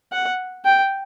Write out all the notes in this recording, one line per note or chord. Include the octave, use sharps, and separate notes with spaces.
F#5
G5